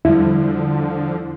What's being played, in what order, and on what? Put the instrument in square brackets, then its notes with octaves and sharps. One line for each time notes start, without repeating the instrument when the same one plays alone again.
[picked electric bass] E2 G3 [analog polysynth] D3 F3 [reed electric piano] E4